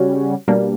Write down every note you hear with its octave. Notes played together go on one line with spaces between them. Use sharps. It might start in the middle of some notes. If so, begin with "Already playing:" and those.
Already playing: C#3 G3 C#4 F#4
B2 G3 A#3 D4